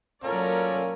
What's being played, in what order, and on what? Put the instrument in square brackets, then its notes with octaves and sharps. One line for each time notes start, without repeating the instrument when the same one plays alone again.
[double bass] F#3 A#3 [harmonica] C#4 [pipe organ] F4 A4 [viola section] A#4 D5